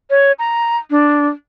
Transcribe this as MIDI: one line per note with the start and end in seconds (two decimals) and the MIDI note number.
0.10 0.32 73
0.39 0.77 82
0.90 1.26 62